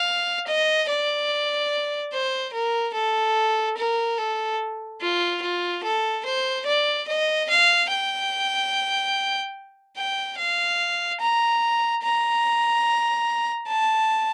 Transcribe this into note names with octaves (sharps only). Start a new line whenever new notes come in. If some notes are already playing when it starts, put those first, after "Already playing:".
Already playing: F5
D#5
D5
C5
A#4
A4
A#4
A4
F4
F4
A4
C5
D5
D#5
F5
G5
G5
F5
A#5
A#5
A5